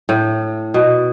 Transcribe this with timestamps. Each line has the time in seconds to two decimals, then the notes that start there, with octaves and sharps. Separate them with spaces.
0.09 A2
0.74 B2